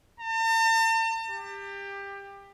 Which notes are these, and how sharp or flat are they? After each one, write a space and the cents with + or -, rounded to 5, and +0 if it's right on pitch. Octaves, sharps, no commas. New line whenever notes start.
A5 +45
G4 +20